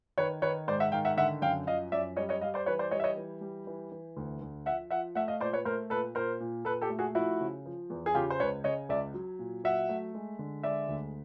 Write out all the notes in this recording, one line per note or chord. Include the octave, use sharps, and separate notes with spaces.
D#3 B4 C#5
D#3 B4 C#5
G#2 C5 D5
E5 F#5
D#3 F5 G5
E5 F#5
D3 E5 F#5
F#2 F5 G5
F3 D#5 F5
F#2 D5 E5
G3 C#5 D#5
C#5 D#5
G3 D#5 F5
C5 D5
E3 B4 C#5
C5 D5
G3 C#5 D#5
E5
C#5 D#5
E3
G3
E3
E3
D2
D2
F3 E5 F#5
F3 E5 F#5
A3 E5 F#5
D#5 F5
A#2 C5 D5
B4 C#5
A3 A#4 C5
A#2 A4 B4
A#2 A#4 C5
A#2
A#2 A4 B4
G4 A4
A3
F#4 G#4
F3 E4 F#4
C#3
F3
E2
G#4
C#3 F4 G4
C5
C#2 B4 C#5
C#3 C#5 D#5
C#2 D5 E5
F#3
A#2
F#3 E5 F#5
A3
G#3
D3
G#3 D5 E5
D2